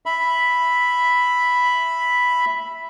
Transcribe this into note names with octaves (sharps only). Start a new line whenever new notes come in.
E5 B5